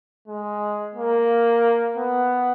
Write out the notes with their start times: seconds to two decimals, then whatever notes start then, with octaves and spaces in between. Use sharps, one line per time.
0.28 G#3
0.95 A#3
1.97 B3